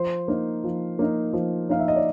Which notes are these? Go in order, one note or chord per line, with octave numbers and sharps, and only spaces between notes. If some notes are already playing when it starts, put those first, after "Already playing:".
Already playing: F3 C5
A#3 D#4
F3
A#3 D#4
F3
A#3 D#4 F5
E5
D#5
D5